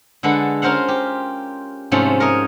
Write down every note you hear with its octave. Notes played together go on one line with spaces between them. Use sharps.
D3 G#3 A4 B4 F#5
C#4 F4 A#4 C5 F5 F#5
G4
G#2 C3 F3 A3 C#4
A#4 C#5 D#5